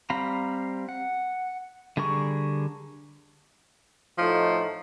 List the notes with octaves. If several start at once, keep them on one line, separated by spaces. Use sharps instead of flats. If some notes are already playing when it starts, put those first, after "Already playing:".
G3 C4 F5 A#5 B5
F#5
D3 G3 G#4 A#4 C#6
A2 F3 A3 D#4